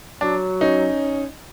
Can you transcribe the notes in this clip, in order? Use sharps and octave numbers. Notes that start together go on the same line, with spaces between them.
F#3 D4
C#4 D#4